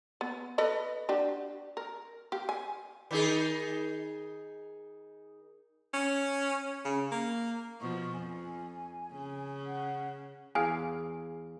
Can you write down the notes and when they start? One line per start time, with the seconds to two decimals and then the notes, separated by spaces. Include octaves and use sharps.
0.21 B3
0.58 A4 B4 D#5
1.09 D4 F#4 G4
1.77 A#4
2.32 G4 F5
2.49 G#5
3.11 D#3 D#4 G#4
5.94 C#4
6.85 C#3
7.12 A#3
7.80 B2 F3 C#6
8.13 F2 G#5
9.12 C#3
9.65 F#5
10.55 E2 G#4 F5 G#5